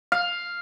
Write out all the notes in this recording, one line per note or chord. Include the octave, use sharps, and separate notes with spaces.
F5